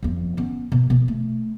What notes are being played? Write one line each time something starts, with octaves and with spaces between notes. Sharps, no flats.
G1 F2
B3 C#4
B2
B2
A3